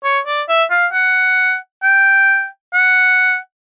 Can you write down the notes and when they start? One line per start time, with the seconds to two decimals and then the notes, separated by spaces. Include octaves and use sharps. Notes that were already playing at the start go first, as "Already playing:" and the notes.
0.04 C#5
0.26 D5
0.48 E5
0.71 F5
0.93 F#5
1.83 G5
2.74 F#5